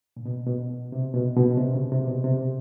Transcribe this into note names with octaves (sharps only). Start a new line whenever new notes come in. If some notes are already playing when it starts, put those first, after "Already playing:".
A#2
B2
B2
C3
B2
B2
C3
C#3
C3
B2
C3